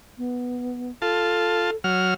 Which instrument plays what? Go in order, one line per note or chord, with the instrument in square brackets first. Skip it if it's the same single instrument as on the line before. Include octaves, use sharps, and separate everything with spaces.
[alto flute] B3
[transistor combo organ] F4 A5 [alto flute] A4
[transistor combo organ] F#3 F6